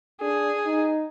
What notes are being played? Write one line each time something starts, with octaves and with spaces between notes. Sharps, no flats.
D4 G#4
D#4